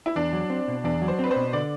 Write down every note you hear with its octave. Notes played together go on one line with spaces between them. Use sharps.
E4
E2 D4
F#3
C4
B2
E2 D4
F#3
C5
C4 B4
C5
B2
D3 D5